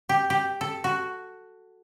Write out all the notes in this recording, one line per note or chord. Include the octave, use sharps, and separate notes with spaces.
G4
G4
A4
F#4